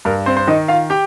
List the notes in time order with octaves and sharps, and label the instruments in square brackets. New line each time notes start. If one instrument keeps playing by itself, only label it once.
[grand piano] G2 A#4
C4 C5
C5
D#3 D#4 D#5
F4 F5
G4 G5